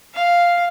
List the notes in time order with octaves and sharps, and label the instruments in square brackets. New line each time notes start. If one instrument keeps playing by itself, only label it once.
[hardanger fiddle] F5